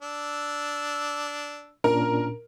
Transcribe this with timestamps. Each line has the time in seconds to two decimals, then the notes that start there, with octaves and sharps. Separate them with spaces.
0.02 D4 E6
1.84 A#2 C#4 D4 A#4